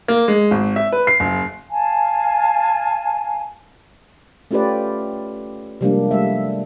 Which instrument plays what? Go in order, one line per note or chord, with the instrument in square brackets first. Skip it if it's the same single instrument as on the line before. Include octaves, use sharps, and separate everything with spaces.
[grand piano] A#3
G#3
G#1
E5
B4
C7
F#1
[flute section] F5 G#5 A5
[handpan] A3 C#4 F4 G4 B4 D5
C3 F3 G3 G#3 A#3 D4
G3 A3 E5